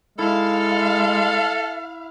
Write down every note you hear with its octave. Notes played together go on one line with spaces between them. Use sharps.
G#3 E4 A4 F5